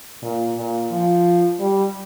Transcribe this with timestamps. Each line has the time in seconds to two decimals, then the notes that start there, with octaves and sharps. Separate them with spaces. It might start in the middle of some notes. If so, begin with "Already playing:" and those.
0.22 A#2
0.57 A#2
0.92 F3
1.60 G3